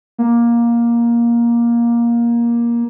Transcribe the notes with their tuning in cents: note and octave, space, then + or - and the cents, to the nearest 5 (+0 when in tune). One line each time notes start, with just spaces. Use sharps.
A#3 +15